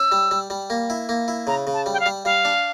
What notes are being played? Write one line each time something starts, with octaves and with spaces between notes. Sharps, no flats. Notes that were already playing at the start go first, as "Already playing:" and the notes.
Already playing: C#4 E6
G3
G3
G3
A#3
E4
A#3
E4
C#3 A#5
C#3
A5
G3
G5
F5
G3
G3 F5
D4